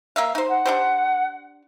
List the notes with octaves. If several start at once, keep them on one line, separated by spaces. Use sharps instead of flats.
A#3 E5 F5
D#4 C5
F#5
D4 G4 C5